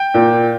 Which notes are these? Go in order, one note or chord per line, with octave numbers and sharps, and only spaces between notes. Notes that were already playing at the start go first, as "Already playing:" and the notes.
Already playing: G5
A#2